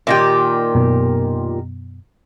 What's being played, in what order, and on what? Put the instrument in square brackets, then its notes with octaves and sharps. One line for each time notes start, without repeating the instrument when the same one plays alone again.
[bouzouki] A#2 D#3 G4
[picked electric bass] F#2 B2 B3